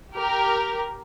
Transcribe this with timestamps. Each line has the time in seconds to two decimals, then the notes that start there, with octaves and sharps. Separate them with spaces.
0.15 G4 A#4